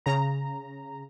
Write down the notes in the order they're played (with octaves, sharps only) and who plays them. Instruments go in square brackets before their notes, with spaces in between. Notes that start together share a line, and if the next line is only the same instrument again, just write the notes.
[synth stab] C#3 A#5